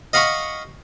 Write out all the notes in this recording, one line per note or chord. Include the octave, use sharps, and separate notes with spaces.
D#5 F5 F#5 B5 C#6